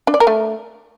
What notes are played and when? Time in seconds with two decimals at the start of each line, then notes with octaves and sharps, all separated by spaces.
0.07 D4
0.14 D5
0.20 A#4
0.27 A3